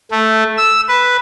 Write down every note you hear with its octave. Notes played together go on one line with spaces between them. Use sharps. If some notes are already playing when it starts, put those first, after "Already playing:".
A3
E6
B4